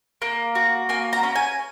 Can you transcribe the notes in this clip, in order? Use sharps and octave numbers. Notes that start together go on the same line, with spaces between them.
A#3
F#4
A#3 G#5
A#5
C#4
G#5